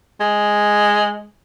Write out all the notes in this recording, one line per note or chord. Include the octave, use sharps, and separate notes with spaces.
G#3